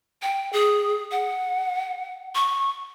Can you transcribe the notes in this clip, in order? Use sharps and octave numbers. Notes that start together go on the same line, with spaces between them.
G5
G#4
F#5
C#6